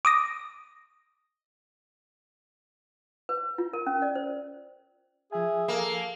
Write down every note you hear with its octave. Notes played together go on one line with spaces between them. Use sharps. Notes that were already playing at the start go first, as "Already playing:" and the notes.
D6 D#6 A#6
B4
F4
A#4
C#4
D5
C5
F3 G#4 E5 G#5
A#3 A4